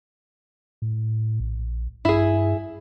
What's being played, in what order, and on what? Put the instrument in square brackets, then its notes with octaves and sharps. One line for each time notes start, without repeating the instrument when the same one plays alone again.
[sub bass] A2
A#1
[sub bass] G2 [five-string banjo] E4 G#4